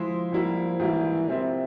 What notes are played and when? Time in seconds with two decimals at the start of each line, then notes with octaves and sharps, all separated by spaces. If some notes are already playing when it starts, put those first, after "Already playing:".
Already playing: F3 G#3 E4 G#4 C5
0.32 G#2 G3 A#3 E4
0.80 G#2 E3 G3 A#3 E4
1.28 C3 F3 C4 F4 A#4 E5